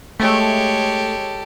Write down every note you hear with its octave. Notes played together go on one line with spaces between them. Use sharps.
G#3 A3 G4 A4 C#5